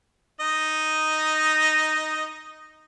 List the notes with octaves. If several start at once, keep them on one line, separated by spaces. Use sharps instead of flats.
D#4 D#5